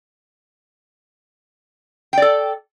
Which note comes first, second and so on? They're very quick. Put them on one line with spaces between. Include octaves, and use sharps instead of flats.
G5 D5 A4